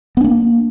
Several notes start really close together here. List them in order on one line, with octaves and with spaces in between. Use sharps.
B3 D4 A#3